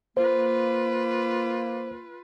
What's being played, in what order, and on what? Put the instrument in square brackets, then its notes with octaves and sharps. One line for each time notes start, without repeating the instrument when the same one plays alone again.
[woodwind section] A#3 [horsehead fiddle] F4 B4 [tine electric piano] C5